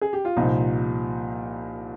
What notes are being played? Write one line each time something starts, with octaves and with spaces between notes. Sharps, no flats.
G#4
G4
F4
C2 A#2 F3 D#4